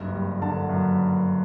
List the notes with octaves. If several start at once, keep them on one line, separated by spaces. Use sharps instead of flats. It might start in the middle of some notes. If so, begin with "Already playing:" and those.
Already playing: F#1 G2
G3
D3 A5
F#2